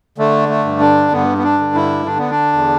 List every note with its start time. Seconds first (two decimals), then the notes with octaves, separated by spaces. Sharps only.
0.18 D3 A3
0.49 A3
0.65 G2
0.80 D4
1.12 G2 B3
1.38 B3
1.43 D4
1.59 D3
1.75 E4
2.06 D3 D4
2.18 B3
2.30 D4
2.53 E2